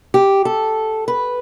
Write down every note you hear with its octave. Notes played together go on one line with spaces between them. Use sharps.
G4
A4
B4